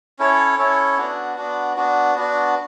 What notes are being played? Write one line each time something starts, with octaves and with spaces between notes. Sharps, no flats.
C#4 E4 A4 C#5
C#4 E4 A4 C#5
B3 D4 F#4
B3 D4 F#4
B3 D4 F#4
B3 D4 F#4